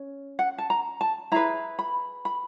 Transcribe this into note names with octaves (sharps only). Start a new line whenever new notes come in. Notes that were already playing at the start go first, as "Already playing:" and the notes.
Already playing: C#4
F#5
A5
A#5
A5
E4 G#4 B4 A#5
B5
B5